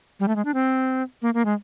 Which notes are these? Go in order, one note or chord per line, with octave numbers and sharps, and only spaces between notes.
G3
A3
G#3
D4
C4
A#3
A#3
G#3